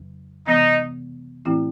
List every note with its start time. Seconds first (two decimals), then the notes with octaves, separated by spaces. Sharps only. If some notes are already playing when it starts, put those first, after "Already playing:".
Already playing: F2 C#3 F#3
0.47 C3 E3 G#3 B3 D#4
1.45 A2 E3 A3 C4 E4